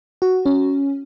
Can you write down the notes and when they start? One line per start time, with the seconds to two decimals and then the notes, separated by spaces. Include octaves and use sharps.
0.22 F#4
0.46 C#4